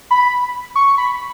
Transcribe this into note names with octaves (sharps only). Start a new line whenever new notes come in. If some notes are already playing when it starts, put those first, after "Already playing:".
B5
C#6
B5